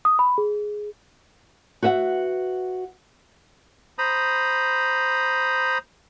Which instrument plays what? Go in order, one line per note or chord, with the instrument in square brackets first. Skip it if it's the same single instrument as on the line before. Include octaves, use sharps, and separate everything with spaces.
[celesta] D#6
B5
G#4
[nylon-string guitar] F#4 B4 E5 F#5
[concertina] C5 A#5 B5 D#6